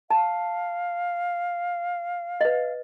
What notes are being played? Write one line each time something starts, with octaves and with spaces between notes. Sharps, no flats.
F5 A5
B4 D#5